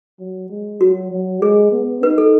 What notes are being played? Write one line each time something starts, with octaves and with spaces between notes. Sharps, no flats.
F#3
G#3
F#3 F#4
F#3
G#3 G#4
B3
D#4 B4
A4